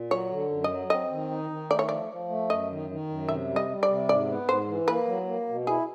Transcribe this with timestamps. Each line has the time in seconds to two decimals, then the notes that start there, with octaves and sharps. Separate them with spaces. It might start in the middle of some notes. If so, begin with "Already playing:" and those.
Already playing: A#2
0.11 F#3 C#5
0.31 D3
0.50 F#2
0.64 D#5
0.71 F#3
0.90 C4 D#5
1.11 D#3
1.31 D#4
1.50 D#3
1.70 A3 D5
1.79 C#5
1.89 F3 D5
2.10 F3
2.29 A3
2.50 F#2 D#5
2.70 D#3
2.90 D#3
3.09 F#2
3.29 C3 E5
3.50 G3
3.56 D#5
3.69 G3
3.83 D5
3.89 C3
4.08 G#2 D5
4.29 B3
4.48 G#2 C5
4.68 E3
4.88 A#3 B4
5.08 F#3
5.28 A#3
5.48 B2
5.67 E4 G#4